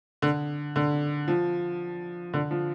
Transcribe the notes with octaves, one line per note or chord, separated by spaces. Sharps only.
D3
D3
F3
D3
F3